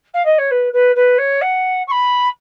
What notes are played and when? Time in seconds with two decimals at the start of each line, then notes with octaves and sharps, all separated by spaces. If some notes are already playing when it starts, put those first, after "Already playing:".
0.13 F5
0.25 D#5
0.38 C#5
0.51 B4
0.73 B4
0.95 B4
1.18 C#5
1.41 F#5
1.87 C#6
1.91 B5